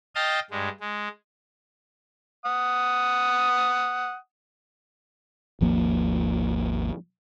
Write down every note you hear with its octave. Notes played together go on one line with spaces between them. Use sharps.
D#5 F5 G5 A5 D#6 F6
G2 G#3
G#3
F#5 D#6
G#1 D#2 F3 A#3